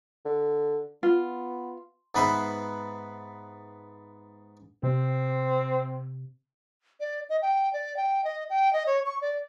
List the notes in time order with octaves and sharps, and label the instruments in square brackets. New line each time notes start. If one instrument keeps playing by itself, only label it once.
[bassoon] D3
[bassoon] B3 [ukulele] F4
[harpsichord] G#2 B3 B4 C5 E5
[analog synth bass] C3 [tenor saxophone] C4
[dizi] D5
D#5
G5
D5
G5
D#5
G5
D#5
C#5
C#6
D5